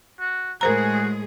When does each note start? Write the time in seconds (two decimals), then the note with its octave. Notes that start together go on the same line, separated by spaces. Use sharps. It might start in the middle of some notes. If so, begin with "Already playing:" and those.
0.20 F#4
0.61 A2 G#3 F#4 G#4 A#4 C5 A#5